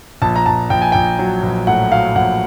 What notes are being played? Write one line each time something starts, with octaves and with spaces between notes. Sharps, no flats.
A#1 A5
A#5
A#1 A5
A#1 G5
G#5
A#1 G5
F#3
A#1
A2 F#5
F#3 F5
A#1 F#5